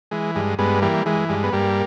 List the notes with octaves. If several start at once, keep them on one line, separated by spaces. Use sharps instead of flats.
E3 G#3
G2 G#3
G2 G#3 B3
E3 G3 A#3
E3 G#3
G2 G#3
B3
G2 G3 A#3